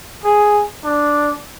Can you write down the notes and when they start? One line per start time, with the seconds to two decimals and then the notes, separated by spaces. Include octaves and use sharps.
0.25 G#4
0.84 D4